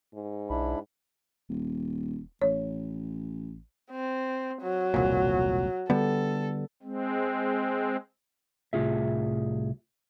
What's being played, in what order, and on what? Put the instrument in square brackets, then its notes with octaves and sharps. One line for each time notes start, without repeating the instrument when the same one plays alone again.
[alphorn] G#2
[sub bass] B1 [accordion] D4 E4 B5
[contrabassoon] D#1
[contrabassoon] A1 [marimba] C#5
[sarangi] C4
F#3
[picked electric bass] E1 C2 A#2
[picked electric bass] D3 G3 B3 [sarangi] A4
[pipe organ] G#3 C4
[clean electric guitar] C2 A2 F4 G#4 E5